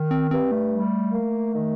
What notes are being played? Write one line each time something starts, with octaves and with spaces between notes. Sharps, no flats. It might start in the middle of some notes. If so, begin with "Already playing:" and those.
Already playing: D#3
C4
G2 C4
A3
G3
A#3
D#3